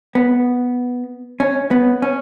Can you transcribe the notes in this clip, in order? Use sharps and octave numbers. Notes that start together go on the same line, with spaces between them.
B3
C#4
B3
C#4